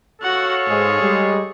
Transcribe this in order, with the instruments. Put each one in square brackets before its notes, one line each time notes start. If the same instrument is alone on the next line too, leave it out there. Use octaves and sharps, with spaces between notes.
[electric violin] F#4 F#5 [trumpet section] A4 C#5 F5
[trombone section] G#2 G#3 [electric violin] G#4
[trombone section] G3 G#3